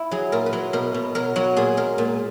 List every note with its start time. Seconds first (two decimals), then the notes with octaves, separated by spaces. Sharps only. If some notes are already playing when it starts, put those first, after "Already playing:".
Already playing: E4
0.11 F#3 G#4
0.32 A#2 A#4
0.46 B4
0.53 F#3
0.73 B2 A#4
0.94 B2
1.15 F#3 A#4
1.36 F#3 F#4
1.57 A#2 G#4
1.77 G#3 A#4
1.98 A#2